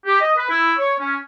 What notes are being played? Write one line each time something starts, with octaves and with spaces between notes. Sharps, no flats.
G4
D#5
B4
E4
C#5
C#4